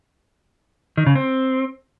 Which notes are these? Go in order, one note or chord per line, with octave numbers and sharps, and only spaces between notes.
D#3
C#3
C4